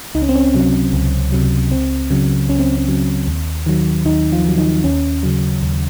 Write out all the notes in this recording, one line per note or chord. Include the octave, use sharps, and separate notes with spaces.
C#2 D#4
C#4
C4
C#4
C3 F#3
C#2
C3 F#3
C#2 C4
C#3 F#3
C#2 C#4
C4
C4
C#3 F#3
D#2
D#3 F#3
D#2 D#3 D#4
F3 F4
D#3 F#3
D#3 D#4
D#2 C#4
C#3 F#3
D#2